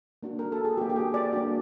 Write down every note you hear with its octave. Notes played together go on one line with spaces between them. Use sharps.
A#3 D4 F#4
A#4
A4
G#4
A#3 D4 F#4 G4
G4
G#4
D5
A#3 D4 F#4